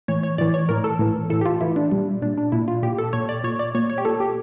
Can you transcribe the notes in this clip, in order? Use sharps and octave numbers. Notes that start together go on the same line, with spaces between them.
A2 E3 C#5
C#5
A2 E3 D5
C#5
A2 E3 A#4
A4
A2 E3
A2 E3 A4
G4
F4
A2 E3 E4
D4
A#2 G3
A#2 D4
D4
A#2 E4
F4
A#2 G4
A4
A#2 C#5
D5
A#2 C#5
D5
A#2 C#5
C#5
G4
A#2 A4
G4